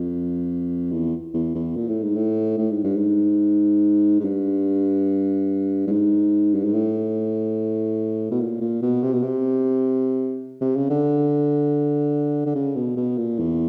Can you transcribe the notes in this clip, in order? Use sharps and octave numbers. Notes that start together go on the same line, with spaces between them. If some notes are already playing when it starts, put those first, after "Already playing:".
Already playing: F2
E2
E2
E2
A#2
A2
G#2
A2
A2
G#2
G2
G#2
G#2
G2
G2
G#2
G2
G#2
A2
B2
A#2
A#2
B2
C3
B2
C3
C3
C#3
D3
D3
C#3
B2
B2
A#2
E2